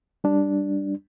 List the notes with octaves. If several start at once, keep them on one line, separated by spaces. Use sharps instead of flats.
G3 D4